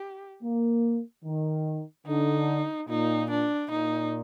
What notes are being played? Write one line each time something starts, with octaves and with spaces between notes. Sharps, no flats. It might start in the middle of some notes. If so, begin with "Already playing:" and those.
Already playing: G4
A#3
D#3
D3 D#4
A#2 D#4
D4
A#2 D#4